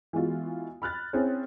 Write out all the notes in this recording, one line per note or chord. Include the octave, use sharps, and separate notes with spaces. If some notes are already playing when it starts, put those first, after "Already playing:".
E3 G#3 B3 F4 F#4
B5 F6 F#6 A6
C4 C#4 E4 G#4 C5